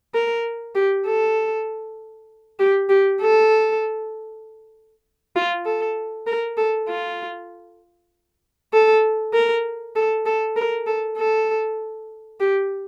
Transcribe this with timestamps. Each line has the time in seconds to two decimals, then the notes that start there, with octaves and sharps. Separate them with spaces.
0.14 A#4
0.75 G4
1.06 A4
2.59 G4
2.89 G4
3.21 A4
5.36 F4
5.66 A4
6.27 A#4
6.57 A4
6.88 F4
8.73 A4
9.33 A#4
9.95 A4
10.26 A4
10.56 A#4
10.86 A4
11.17 A4
12.40 G4